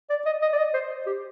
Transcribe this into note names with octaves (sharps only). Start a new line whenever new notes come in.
D5
D#5
D#5
D5
D#5
C5
G4